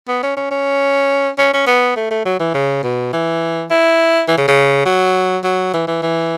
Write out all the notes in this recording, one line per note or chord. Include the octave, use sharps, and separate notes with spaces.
B3
C#4
C#4
C#4
C#4
C#4
B3
A3
A3
F#3
E3
C#3
B2
E3
E4
E3
C#3
C#3
F#3
F#3
E3
E3
E3